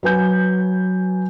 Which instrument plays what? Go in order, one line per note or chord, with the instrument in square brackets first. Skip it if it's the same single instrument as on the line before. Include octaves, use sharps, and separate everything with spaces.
[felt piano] F#3 B4 G#5 G6